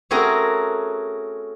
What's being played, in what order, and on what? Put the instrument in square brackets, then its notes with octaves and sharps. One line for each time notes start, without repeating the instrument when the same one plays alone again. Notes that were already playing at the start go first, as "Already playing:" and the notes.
[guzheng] A3 C4 C#4 F#4 G#4 A#4